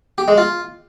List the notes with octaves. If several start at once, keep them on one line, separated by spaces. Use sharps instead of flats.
G4
G#3
F4